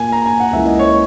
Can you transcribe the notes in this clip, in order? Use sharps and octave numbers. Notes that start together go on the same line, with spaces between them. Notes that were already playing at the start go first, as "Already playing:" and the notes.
Already playing: A#2 A#3 G#5
A#5
G#5
F#5
C#2 C#3 E3 A#3 E5
D#5
C#5